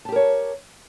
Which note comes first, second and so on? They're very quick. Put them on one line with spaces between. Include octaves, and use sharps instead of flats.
A5 G4 A#4 C#5